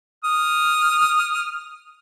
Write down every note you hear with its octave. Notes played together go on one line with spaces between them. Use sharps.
D#6 F6